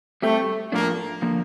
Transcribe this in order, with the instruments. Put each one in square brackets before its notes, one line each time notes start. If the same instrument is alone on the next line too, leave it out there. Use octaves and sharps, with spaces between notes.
[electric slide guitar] G3 C4 G4 [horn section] A3
[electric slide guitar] A2 F3 A3 D4 [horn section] A#3
[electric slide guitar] D3 F3 A#3